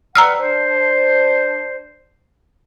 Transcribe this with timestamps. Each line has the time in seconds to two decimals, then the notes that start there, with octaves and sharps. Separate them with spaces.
0.15 G3 B4 F#5 A#5 E6 F6
0.38 D4 C5